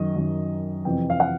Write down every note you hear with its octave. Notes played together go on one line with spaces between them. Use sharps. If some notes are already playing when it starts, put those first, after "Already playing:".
Already playing: F#2 D#3 D#5
F#2 D#3
F2 C3 E3 G5
F5
F#5